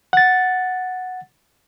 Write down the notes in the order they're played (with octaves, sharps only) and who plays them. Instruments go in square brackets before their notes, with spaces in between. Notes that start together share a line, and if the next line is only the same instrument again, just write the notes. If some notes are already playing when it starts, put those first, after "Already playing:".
[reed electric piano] F#5 A6